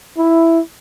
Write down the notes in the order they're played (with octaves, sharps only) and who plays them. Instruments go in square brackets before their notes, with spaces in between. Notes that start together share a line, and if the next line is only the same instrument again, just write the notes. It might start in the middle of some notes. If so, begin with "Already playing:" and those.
[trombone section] E4